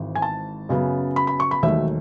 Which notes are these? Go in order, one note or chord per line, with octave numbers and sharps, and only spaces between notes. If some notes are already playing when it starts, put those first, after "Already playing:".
Already playing: G#1 G#2 E3
G#5
A5
F#2 C#3 F#3 B3
B5
B5
C#6
B5
E1 D#2 D#3 F#3 A3 E5